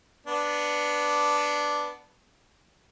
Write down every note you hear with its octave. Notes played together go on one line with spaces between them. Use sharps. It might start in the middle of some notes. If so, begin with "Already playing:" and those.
B3 D4